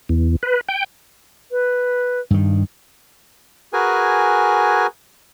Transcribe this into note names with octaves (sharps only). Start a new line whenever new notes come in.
E2
B4
G5
B4
G2 D#3
F#4 G#4 A#4 B4 G#5